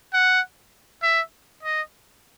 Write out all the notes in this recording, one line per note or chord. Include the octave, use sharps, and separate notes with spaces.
F#5
E5
D#5